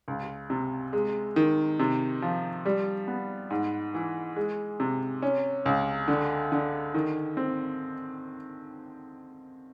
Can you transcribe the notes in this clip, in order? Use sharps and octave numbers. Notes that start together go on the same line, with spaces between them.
C#2
C3
G#3
D#3
C3
F3
G3
B3
G#2
E3
G#3
C3
C#4
C#2
D3
D3
D#3
C4